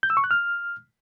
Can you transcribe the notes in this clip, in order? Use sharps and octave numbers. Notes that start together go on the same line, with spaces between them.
G6
E6
C#6
F#6
F6